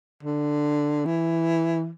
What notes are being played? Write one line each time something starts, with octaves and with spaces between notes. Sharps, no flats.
D3
E3